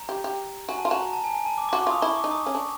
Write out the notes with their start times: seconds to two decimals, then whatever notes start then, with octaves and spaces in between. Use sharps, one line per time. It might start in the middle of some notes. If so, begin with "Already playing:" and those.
Already playing: A#5
0.09 G4
0.24 G4
0.68 F#4 G#5
0.79 A5
0.85 F4
0.90 F#4 A#5
1.01 A#5
1.13 A5
1.24 G#5
1.35 G#5
1.46 A5
1.58 D6
1.69 D6
1.73 F#4 C#6
1.79 D6
1.87 F4 D#6
2.02 E4 C#6
2.16 D6
2.24 D#4
2.31 D#6
2.46 C#4
2.55 D4